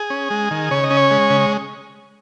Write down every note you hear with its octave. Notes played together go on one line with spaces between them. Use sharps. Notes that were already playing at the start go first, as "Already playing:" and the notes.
Already playing: G#4
C#4
G#3
D#3
C#3 C#5
D#5
C#4
C#5
G#3
C#3